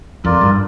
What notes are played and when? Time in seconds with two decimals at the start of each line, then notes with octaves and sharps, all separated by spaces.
0.24 F2 F4 A#4 D5
0.41 G2